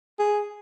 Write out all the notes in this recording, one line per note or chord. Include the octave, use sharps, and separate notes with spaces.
G#4